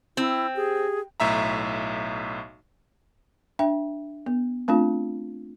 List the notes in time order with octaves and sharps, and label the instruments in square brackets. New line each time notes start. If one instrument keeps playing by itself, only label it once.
[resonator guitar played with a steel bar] C4 [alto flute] E4
[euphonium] G4 [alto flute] G#4
[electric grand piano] B1 A2 E5 A#5
[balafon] D4 E5 G5
B3
A3 C4 D4 F4